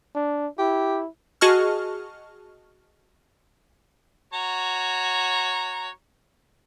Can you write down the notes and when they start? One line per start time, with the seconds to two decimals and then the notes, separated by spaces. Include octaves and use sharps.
0.15 D4
0.59 E4 G4
1.41 F#4 G#4 D#5 A5 C#6 F6
4.33 F#4 C#5 A#5